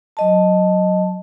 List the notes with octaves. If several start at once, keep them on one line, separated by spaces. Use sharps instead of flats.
F#3 D#5 A5